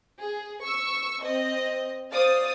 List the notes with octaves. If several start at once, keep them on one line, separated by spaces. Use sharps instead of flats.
G#4
C#6 E6
C4 D#5
C5 D5 F5 D#6 A6